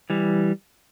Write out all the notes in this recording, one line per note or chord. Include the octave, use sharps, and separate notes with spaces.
E3 G3